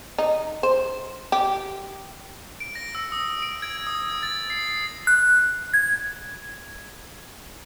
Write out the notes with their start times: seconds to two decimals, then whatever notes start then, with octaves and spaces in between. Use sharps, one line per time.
0.18 D#4
0.63 C5
1.32 G4
2.60 D7
2.75 A#6
2.95 E6
3.12 D#6
3.42 D7
3.62 G#6
3.87 D#6
4.09 G#6
4.23 A6
4.50 C7
4.67 C7
5.07 F#6
5.74 G#6